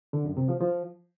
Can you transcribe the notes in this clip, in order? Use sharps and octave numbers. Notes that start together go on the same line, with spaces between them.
D3
F#2
C3
F3
F3